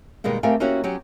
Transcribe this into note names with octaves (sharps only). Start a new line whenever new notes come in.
B2 D#3 G3 G#3 A#3
A3 C4 G4 A#4 F5 G#5
A#3 B3 C#4 E4 F#4 G4
F#3 B3 C#4 G4